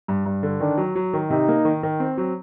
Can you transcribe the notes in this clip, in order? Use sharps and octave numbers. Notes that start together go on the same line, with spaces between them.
G2
G2
D3
D#3 D4
F#3
F#3
D#3
C3 D#4
A#3
D#3
D#3
C4
F#3